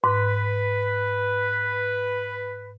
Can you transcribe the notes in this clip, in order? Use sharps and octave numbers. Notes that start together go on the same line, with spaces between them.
G#2 B4